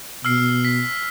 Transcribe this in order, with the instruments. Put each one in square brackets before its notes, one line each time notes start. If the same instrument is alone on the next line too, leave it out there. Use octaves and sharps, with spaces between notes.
[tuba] B2 [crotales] E6 F6 C7
[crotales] B6